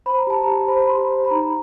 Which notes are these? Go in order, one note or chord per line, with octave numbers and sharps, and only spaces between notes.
C5 B5
A#5
G4 A5
A#5
G4
C5 B5
B5
G4 C6
C5 B5
B5
D#4 A#5